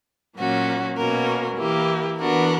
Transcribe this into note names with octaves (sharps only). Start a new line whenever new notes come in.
A#2 F#3 A#3 C#4 F#4
B2 A#3 C#4 F#4 A#4
E3 A#3 E4 G4 A#4
E3 B3 D4 F#4 A#4